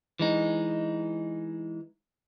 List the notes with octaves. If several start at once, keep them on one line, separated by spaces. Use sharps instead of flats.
E3 G#3 D#4